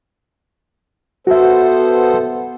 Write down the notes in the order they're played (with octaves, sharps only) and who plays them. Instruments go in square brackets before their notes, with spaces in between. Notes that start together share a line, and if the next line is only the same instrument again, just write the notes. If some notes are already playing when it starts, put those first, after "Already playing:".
[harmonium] B3 A4 C5 [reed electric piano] F#4 E5